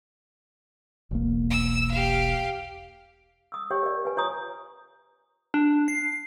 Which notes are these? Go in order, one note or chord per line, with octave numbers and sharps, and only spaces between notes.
E1 B1 A#3
E6
G4 F5
D#6 E6
G4 C#5 G5
A#4 D5
B4 G#5
F4 C#5 A#5 D#6
D4
C7